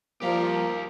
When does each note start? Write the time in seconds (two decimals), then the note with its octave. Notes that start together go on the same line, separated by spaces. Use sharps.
0.22 F3 G3 A#3 G4 A#4 F5